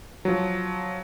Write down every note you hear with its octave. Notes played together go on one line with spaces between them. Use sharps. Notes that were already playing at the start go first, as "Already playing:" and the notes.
F3 F#3